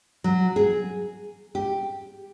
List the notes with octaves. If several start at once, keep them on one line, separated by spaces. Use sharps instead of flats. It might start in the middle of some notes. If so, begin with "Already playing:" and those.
F#3
G#4
G4